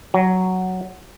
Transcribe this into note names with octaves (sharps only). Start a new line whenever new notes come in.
F#3